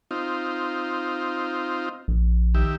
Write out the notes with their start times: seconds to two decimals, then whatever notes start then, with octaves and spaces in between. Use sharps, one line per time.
0.11 C4 D#4 F4
2.08 A#1
2.55 D#3 G4 E5